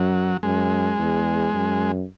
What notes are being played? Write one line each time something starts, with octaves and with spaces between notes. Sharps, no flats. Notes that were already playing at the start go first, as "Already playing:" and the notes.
Already playing: F#2 F#3
F#2 G#3
E2
F#2